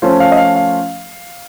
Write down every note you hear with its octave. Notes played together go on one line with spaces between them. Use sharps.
F3 A3 C#4 F4 C5
F5
D#5
F5
F5